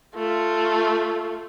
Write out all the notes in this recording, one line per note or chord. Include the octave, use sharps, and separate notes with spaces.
A3 F4